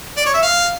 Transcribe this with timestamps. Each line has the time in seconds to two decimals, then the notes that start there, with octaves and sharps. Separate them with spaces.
0.17 D5
0.26 C#5
0.34 E5
0.43 F5